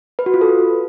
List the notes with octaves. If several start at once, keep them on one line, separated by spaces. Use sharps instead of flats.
B4
F#4
F4
A4